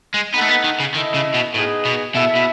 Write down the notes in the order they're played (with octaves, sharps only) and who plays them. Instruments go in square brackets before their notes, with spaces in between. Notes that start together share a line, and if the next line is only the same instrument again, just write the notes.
[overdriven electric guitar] G#3
[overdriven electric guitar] B3 [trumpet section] D#4 A4 D#5 F#5
[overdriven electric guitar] A3
B3
D#3
C#3
[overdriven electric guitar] D#3 [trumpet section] E4 A4 D#5
[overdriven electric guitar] C#3
B2
[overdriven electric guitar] A2 [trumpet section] B3 D#4 G#4 D#5
[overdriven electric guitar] B2
[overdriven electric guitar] B2 [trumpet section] E4 A4 E5
[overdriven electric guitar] B2